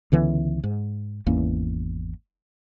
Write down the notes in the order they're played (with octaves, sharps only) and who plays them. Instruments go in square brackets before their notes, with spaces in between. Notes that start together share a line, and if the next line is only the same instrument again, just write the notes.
[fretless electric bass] C#2 D3 E3 B3
G#2
G#1 E2 A#3 C#4